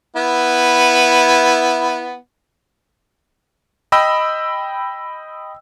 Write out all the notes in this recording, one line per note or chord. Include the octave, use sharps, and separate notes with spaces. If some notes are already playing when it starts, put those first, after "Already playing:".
B3 E4
D#5 G5 B5 E6